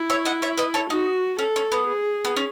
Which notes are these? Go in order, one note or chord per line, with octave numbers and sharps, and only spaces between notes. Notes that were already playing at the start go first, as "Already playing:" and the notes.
Already playing: E4
C#5 E5
D#5 F#5
C#5 E5
B4 D#5
A4 C#5
D#4 F#4
C#4 A4
C#4
B3
G#4
B3
C#4